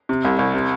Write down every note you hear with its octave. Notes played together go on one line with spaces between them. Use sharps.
C3
C2
C2
C3